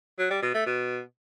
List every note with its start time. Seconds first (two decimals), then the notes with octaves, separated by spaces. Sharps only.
0.18 F#3
0.30 G3
0.42 B2
0.54 A3
0.66 B2